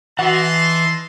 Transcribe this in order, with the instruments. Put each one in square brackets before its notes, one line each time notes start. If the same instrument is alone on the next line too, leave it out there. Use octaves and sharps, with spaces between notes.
[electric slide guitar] E3 [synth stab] F#4 [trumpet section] D#5 A5 C6